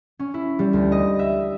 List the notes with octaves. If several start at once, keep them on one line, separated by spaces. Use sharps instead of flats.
C#4
E4
G3
D2
D#5
E5